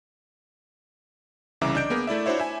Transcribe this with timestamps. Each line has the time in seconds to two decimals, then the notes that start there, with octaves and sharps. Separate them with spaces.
1.61 C2 C#3 E3 E5 A#5 D6
1.75 D4 D#5 G6 D7
1.90 A#3 B3 G#4 A#4
2.07 A3 E4 D5 E5
2.26 D4 E4 F#4 C5 C#5 E5
2.39 E4 E5 G#5